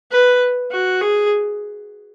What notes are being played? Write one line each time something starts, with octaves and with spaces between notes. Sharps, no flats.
B4
F#4
G#4